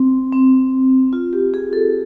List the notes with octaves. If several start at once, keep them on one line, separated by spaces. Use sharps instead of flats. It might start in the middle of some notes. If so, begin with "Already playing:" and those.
Already playing: C4
C4
F4
G4
G#4
A4